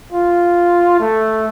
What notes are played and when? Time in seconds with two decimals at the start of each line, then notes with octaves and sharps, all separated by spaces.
0.13 F4
1.00 A3